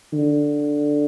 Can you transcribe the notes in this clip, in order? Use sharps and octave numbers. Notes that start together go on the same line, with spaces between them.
D3